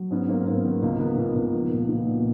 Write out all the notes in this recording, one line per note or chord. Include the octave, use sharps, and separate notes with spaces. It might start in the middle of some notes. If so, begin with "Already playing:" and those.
Already playing: F#3
G#2 B3 C#4
G#2 A#3 C4
B3
G#2 A#3 C4
D#3 B3
C#2 A#3
D#3 B3
C#2 B3
C#2 A#3
F3 B3
A#2
A#3
A#2 A#3
B3
A#2